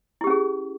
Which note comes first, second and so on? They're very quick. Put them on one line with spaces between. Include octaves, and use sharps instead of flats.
E4 G4 C#4 G#4